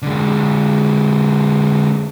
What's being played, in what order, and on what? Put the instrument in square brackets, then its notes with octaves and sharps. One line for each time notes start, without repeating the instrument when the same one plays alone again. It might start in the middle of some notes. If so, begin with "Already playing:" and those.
[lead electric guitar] D3 G#3